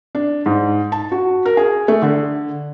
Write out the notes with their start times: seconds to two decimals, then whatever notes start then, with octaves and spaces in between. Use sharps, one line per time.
0.15 D4
0.46 G#2
0.92 A5
1.12 F#4
1.45 A#4
1.57 G#4
1.88 A3
2.02 D3